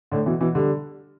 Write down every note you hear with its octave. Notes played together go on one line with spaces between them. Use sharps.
A2 D3
B2 E3
B2 E3
D3 G3